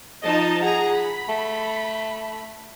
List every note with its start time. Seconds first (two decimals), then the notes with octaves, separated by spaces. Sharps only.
0.23 F3 D#4 D#5 A5
0.62 G#4 F#5 A#5
0.95 B5
1.29 A3